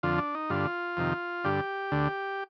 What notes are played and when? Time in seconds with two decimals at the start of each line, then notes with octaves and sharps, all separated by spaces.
0.03 F2 D3 F4
0.18 D4
0.35 D#4
0.50 G2 D3 F4
0.97 F2 C3 D#3
1.44 G2 D3 G4
1.92 D2 D3